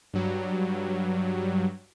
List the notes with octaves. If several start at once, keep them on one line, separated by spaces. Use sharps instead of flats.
G2 F#3 G3